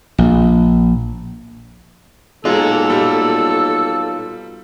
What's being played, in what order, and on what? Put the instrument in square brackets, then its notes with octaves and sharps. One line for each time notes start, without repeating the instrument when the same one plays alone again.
[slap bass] A#1
[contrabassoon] B1 [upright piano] G#3 [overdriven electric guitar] F4 A#4 [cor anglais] A4
[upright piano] G3